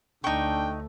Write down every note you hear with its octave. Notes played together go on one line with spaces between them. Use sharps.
D2 A3 D4 D#4 G5 C#6